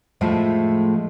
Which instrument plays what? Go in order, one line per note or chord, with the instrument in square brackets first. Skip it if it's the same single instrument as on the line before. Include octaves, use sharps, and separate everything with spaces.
[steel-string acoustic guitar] A2 F3 G#3 A3